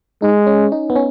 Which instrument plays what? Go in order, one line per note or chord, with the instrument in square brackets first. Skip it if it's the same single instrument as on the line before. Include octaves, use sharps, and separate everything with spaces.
[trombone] G#3 [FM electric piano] D#4
[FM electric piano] C#4
D#4
B3
C#4